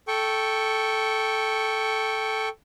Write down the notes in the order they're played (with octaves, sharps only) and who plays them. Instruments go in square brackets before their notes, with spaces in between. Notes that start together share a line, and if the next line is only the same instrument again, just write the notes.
[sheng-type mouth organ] A4 G5 C#6